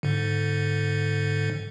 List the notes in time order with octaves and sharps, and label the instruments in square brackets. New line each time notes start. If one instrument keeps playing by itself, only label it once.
[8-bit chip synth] G#2 D3